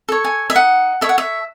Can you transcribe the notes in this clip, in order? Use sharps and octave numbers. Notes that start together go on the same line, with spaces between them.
A4 C#5
G#5
E5
D#4 F#5
A4 C#5 E5
F#5
E5